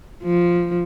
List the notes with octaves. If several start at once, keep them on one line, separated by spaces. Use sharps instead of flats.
F3